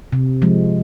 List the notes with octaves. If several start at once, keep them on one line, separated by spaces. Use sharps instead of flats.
C3
F3 G#3